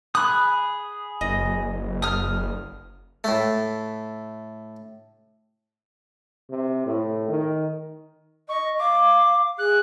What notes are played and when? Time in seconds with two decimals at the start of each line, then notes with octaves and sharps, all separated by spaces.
0.15 G#4 B5 D#6 F#6
1.21 F#1 D#5
2.02 D#6 F6
3.24 A2 A3
6.50 C3
6.86 A2
7.29 D#3
8.49 D#5 C#6
8.79 F5 D6
9.58 G#4 F#6